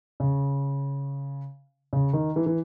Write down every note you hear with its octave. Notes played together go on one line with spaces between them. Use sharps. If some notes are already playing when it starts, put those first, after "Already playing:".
C#3
C#3
D#3
E3
E3